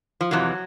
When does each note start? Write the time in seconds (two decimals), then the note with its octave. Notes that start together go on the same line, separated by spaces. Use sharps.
0.21 F3
0.31 F2 C3 E3 F#3